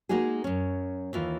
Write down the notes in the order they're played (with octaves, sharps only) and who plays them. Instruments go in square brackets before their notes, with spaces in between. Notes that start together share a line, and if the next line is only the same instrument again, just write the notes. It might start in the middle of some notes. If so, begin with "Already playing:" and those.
[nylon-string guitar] G#3 A#3 D#4 F#4 G#4
F#2 C#4
D#2 E3 F4